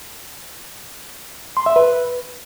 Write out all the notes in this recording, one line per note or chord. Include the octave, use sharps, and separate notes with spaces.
C6
E5
B4